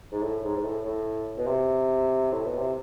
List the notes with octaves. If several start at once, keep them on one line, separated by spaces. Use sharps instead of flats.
G#2
A2
G#2
G#2
A2
A2
B2
C3
A2
B2
C3